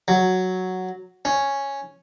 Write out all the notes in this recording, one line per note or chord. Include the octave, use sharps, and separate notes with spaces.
F#3
C#4